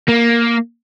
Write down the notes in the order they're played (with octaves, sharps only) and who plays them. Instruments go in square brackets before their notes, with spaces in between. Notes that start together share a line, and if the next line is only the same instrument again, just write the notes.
[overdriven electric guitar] A#3